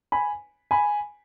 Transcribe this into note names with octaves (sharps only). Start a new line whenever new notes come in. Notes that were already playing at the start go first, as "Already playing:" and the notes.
G#5 B5
G#5 B5